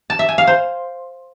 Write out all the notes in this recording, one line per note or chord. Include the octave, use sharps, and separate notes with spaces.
A5
E5
G#5
F5
C5